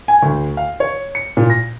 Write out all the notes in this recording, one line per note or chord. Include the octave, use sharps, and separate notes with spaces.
G#5
D2
F5
C#5
C#7
A#2
A#6